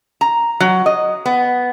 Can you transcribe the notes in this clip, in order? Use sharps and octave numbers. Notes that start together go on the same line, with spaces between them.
A#5
F#3
D#5
B3